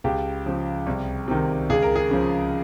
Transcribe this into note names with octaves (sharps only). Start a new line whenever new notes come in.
C#2 G4
C#3 F3
C2
C3 D#3
C#2 G#4
A#4
G#4
C#3 F3